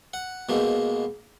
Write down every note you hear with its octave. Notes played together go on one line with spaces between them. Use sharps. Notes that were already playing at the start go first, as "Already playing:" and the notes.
F#5
B2 G#3 A#3